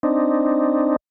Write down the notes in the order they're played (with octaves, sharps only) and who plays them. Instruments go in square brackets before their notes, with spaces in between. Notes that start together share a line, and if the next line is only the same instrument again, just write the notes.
[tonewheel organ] C4 D4 D#4